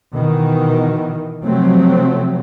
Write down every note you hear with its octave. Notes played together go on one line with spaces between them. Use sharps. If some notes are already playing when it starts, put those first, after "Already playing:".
B2 D#3 E3
C3 F3 F#3 A3 C4